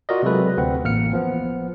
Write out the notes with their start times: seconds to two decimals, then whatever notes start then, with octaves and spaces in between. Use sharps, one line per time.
0.09 F4 F#4 A#4 D5 D#5
0.23 C3 F#3 G#3 A4 B4
0.57 D2 C4 B4 F#5
0.84 A1 A#3 F6 C#7
1.13 F3 B3